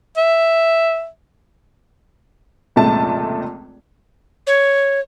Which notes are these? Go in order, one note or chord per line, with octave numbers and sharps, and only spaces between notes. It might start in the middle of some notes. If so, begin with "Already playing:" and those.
E5
F1 C#2 A#2 G#3 A3 A5
C#5